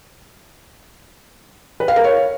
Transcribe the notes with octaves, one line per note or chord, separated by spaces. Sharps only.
B4
F5
A#4
C#5